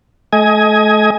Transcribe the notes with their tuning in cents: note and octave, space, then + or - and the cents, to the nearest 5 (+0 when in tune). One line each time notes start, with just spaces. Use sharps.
A3 -35 D#5 +25 G#5 +0